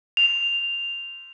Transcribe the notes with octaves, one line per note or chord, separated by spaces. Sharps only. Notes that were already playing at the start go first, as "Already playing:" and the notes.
F7